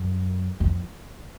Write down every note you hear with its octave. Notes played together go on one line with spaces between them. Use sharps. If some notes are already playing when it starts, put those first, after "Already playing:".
Already playing: F#2
F2